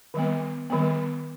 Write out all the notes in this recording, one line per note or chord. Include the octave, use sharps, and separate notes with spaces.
D#3 G3 B3
D#3 G3 B3